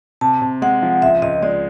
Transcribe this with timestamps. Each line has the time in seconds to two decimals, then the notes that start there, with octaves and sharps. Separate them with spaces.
0.21 C3 A5
0.42 C3
0.62 G#3 F#5
0.82 F3
1.02 C#2 E5
1.22 C#2 D#5
1.42 G#3 D5